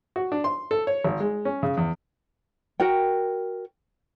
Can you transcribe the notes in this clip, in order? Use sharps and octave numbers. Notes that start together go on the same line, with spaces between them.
F#4
D4
C6
A4
C#5
G#1
G#3
C#4
C#3
E2
F#4 A#4 G5